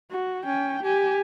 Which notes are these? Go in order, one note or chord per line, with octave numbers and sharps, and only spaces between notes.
F#4
C#4 G5
G4 G#5